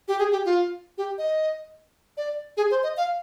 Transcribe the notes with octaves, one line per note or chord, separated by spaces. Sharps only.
G4
G#4
G4
F4
G4
D#5
D5
G#4
C5
D#5
F5